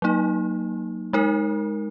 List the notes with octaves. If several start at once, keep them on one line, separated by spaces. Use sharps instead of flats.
F#3 A#3 D#4
G#3 D#4 A#4